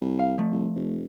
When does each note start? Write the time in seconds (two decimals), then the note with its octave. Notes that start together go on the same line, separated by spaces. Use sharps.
0.01 C2
0.19 F5
0.38 F3 A3
0.51 C2
0.75 F1